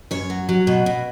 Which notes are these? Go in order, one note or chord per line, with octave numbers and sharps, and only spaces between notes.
F#2 C#5
F#3
F#3
B2
B2